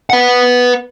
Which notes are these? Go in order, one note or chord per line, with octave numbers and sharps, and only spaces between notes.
B4 F#5